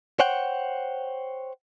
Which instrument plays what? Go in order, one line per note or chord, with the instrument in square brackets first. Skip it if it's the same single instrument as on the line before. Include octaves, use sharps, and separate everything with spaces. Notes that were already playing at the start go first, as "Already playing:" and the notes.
[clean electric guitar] C5 C#5 F#5 G5